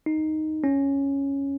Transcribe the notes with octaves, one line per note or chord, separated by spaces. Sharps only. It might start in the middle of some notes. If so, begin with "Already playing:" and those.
D#4
C#4